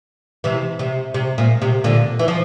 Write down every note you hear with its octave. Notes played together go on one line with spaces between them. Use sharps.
C3 E3
C3
C3
A#2
C3
A#2 D3
E3
F3